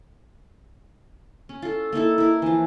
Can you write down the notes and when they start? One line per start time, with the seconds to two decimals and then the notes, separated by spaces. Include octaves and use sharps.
1.49 C#4
1.62 F4 A4
1.93 A#3 D#4 E4 A4
2.18 E4 A#4
2.42 E3 F3